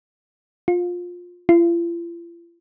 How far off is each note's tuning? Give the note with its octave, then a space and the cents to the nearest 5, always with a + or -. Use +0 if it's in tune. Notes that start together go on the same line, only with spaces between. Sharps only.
F4 +20
F4 -45